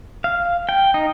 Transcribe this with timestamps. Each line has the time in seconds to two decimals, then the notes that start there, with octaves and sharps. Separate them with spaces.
0.24 F5
0.69 G5
0.94 D#4